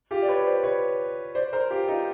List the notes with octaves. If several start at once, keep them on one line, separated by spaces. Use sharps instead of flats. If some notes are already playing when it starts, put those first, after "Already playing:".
F4 G4
D5
B4 C#5
C5 D5
B4 C#5
C5 D5
A#4 C5
F4 G4
D#4 F4